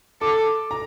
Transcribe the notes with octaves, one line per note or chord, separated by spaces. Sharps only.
A4 D6
A#5